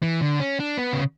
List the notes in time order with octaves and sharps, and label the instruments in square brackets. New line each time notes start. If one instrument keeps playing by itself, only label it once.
[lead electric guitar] E3
D3
C#4
D4
B3
C#3